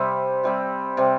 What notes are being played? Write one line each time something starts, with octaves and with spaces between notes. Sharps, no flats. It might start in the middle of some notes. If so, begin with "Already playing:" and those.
Already playing: C3 G3 C4
C3 G3 C4
C3 G3 C4